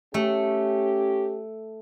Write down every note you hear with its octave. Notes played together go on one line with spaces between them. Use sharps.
A3 C#4 G4